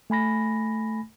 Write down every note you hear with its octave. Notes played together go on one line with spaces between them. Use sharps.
A3 G#5 B5 A#6